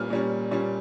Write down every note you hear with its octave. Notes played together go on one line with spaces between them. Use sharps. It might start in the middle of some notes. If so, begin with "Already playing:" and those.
Already playing: A#2 G3 C#4 F6
A#2 G3 C#4
A#2 G3 C#4